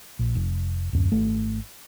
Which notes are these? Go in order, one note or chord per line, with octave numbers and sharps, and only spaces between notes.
A#1
F1
D1 F#2
G#1 A3